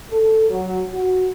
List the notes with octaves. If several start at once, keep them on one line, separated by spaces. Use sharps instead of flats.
A4
F#3
F#4